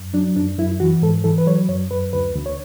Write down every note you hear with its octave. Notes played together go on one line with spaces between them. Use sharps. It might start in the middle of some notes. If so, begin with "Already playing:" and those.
Already playing: F#2
F#3 D4
F#2 D4
F#2 E4
E3 F#4
G#2 A4
E3 A4
B4
F#3 C#5
F#2 C#5
F#2 B4
D2 B4
D2
C#5